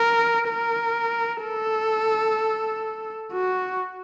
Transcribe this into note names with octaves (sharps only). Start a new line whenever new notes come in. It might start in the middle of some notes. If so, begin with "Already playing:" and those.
Already playing: A#4
A#4
A4
F#4